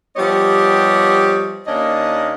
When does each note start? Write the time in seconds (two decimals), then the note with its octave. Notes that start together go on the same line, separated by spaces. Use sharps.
0.16 F3 G3 B3 G4 C#5 D#5
1.67 D#2 A#3 C#4 D4 D#5